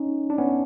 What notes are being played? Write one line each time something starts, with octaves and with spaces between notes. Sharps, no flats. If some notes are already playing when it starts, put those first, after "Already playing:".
Already playing: C#4 D#4
D4
B3 C#4